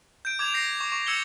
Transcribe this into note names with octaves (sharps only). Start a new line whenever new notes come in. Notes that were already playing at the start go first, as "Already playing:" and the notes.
G6 D7
D6 G#6 E7 F7
G6 A#6 C7
C#6
C#6
E6 G#6 C#7 E7 G7